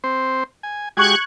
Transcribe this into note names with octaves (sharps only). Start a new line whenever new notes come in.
C4 C5
G#5
G#3 F#4 G4 C#6 F#6 G#6